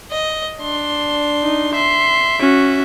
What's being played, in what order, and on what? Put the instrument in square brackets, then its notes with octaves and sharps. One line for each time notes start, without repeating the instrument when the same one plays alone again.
[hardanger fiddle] D#5
D4 C6
[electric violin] D#4
[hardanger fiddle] E5 [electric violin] C6
[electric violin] C#4 F#4